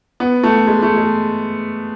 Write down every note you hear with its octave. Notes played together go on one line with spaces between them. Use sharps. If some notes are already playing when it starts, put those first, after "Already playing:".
B3
A3
G#3
A3
G#3